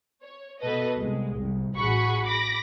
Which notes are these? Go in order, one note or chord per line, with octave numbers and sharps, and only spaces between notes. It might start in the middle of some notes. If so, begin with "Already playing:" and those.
C#5
B2 A4 B4 D#5
C2 G#3
C2
A1 F#4 G#4 F#5 B5 C#6
B5 D6 A#6